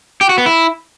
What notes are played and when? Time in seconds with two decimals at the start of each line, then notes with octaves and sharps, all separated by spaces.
0.21 G4
0.29 F#4
0.38 B3
0.46 E4